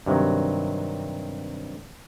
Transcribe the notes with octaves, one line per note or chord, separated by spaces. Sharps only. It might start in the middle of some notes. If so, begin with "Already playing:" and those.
G2 C3 D#3 F#3